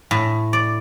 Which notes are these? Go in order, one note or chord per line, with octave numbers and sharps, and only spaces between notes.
A2
D5